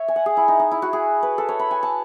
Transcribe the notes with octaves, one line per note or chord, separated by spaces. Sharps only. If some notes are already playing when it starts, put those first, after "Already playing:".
Already playing: C#5 E5
G#5
F#5
G#4
E4
D#4
D#4
E4
F#4
G#4
B4
A4
C#5
B5
G#5
A5